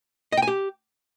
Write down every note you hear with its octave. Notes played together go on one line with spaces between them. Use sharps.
D#5
G5
G#5
G4